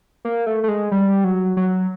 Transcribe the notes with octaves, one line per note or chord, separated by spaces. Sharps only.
A#3
A3
A3
G#3
G3
F#3
F#3